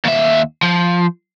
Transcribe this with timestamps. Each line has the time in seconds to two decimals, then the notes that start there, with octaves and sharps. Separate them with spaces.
0.05 D#2 E5
0.63 F3